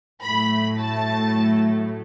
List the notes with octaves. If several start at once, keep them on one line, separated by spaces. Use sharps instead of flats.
A2 F#3 A3 B5
A5